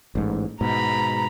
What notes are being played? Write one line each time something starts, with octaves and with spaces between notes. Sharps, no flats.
A1 G#2
G#2 B2 A#5 B5